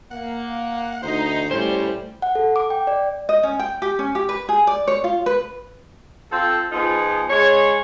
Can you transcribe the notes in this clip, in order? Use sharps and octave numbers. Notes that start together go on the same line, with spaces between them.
A#3 F#5
D2 D#4 C5
A2 G3 C#4 C5
F#5
A4
D6
G5
D5
D#5
C#4
G5
G4
C#4
G4
B4
G#4
D5
C#5
F4
B4
C4 F4 A4
F3 B3 D#4 F4 G#4
G#3 C#5